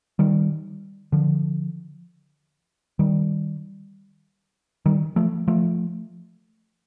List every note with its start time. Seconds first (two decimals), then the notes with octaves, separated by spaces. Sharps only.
0.19 D#3 G3
1.12 D3 F3
2.99 D#3 G3
4.86 D#3 G3
5.16 F3 A3
5.48 F3 A3